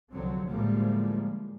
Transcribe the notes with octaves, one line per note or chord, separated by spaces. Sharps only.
C2 D3 F3 F#3 C4
A2 D3 F3 G3 G#3 A#3